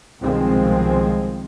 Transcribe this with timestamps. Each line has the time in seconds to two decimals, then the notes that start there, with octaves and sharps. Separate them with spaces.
0.21 C2 B2 D#3 F3 G#3 C4